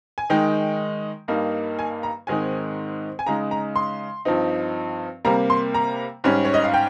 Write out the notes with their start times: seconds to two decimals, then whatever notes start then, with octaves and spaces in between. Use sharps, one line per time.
0.18 G#5
0.30 D#3 G#3 D#4 G5
1.28 G2 G3 A#3 D#4
1.79 G#5
2.03 A#5
2.27 G#2 D#3 G#3 C4 D#4 G#5
3.19 G#5
3.27 C#3 G#3 D#4 A#5
3.51 A#5
3.76 C6
4.25 G2 F3 C4 D#4
5.25 C3 G3 A#3 A#5
5.50 C6
5.74 A#5
6.24 G#2 G3 C#4
6.45 C#5
6.54 D#5
6.64 F5
6.74 G5